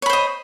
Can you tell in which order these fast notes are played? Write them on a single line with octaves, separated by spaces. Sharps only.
C#5 B5 C5 D#5